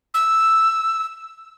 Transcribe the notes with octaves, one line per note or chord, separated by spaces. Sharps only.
E6